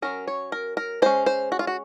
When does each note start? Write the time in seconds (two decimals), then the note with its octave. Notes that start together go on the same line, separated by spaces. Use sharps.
0.02 F#3 C#4 A#4
0.27 C#5
0.52 A#4
0.77 A#4
1.02 G#3 C#4 C5
1.26 C5
1.52 F#4
1.59 F4
1.67 F#4